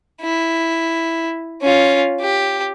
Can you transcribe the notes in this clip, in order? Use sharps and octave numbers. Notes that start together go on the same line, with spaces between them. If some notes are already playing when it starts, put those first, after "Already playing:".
E4
C#4 F4
G4